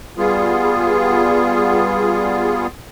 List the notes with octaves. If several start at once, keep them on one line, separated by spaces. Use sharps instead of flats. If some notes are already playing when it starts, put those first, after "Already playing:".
G3 B3 F4 G#4